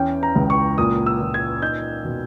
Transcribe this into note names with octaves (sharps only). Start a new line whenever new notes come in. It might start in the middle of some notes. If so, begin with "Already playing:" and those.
Already playing: E2 C#4 G5
A#5
C#2
C#6
A#2 D#6
E6
A#2
G#6
D#4 G6
B2